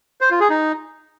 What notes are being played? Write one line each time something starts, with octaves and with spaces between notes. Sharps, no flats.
C5
F4
G#4
D#4